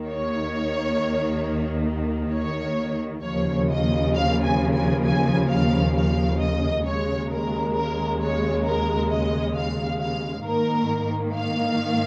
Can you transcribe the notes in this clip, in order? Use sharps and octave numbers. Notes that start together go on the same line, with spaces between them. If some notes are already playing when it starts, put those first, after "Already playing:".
Already playing: D#2 D#3 A#3
C#5
C#5
D#2 C#3 F3 A#3 C#5
D#5
F5
G#5
G#5
G#5
F5
F5
D#5
D#2 C#3 G#3 C#5
A#4
A#4
C#5
A#4
D#5
F5
F5
G#2 D#3 A#3 A#4
F5